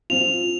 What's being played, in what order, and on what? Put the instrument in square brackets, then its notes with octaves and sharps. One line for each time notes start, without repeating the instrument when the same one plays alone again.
[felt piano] F3 C4 F4 [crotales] F7